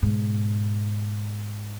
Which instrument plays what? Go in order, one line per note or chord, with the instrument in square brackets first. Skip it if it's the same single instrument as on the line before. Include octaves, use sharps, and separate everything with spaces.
[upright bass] G#2 B2